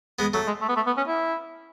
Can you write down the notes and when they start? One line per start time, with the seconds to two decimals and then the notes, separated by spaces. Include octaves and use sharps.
0.19 G#3 B3
0.34 F#3 A3
0.47 G#3
0.61 A3
0.69 B3
0.76 A3
0.87 B3
0.97 C#4
1.07 E4